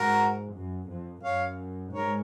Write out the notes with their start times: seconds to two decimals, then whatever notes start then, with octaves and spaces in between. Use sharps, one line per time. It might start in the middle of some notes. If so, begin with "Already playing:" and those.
Already playing: G#2 F#4 A#4
0.55 F#2
0.89 F2
1.23 F#2 C#5 F5
1.93 G#2 A#4 C#5